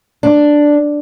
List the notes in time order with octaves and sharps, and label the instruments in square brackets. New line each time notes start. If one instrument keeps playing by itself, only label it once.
[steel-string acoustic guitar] D4